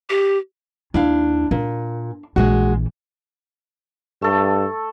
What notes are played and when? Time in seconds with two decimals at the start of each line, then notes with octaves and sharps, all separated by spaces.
0.10 G4
0.94 D#2 D4 E4 F5
1.51 A#2 D4
2.36 A#1 E3 G#3 F#4
4.22 G2 A3 A4